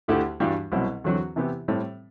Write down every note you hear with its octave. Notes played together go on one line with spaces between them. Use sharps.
D2 D3 A3 E4 G4
G2 E3 G3 D4 F#4
C2 B2 F#3 C4 E4
E2 D3 F#3 C4 F#4
C3 E3 B3 E4 G4
A2 G3 C4